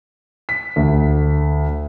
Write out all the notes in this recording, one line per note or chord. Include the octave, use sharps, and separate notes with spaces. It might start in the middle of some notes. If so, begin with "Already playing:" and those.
B6
D2